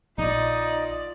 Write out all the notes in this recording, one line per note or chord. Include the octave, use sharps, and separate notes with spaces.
A#1 D#4 F4 D5 D#5